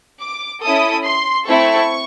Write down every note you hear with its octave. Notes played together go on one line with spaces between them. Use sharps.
D6
C#4 E4 A4 D#6
C6
A3 C4 E4 A4 C#6